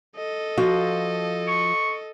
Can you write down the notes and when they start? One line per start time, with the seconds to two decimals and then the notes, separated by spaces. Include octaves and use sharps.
0.16 A4 D#5
0.57 F3 F#4 F5
1.48 C#6